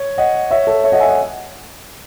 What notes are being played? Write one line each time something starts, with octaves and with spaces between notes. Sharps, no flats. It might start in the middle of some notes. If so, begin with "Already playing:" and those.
Already playing: C#5
D#5 F#5
C#5 E5
A4 C#5
C#5 E5
D#5 F#5
E5 G#5
D#5 F#5